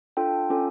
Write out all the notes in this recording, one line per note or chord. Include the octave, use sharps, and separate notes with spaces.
D4 F4 A4 G5
C#4 F4 A4